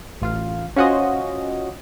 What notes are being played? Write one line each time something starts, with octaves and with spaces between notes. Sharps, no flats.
A1 F4 F5
C#4 F4 F#4 C5 D#5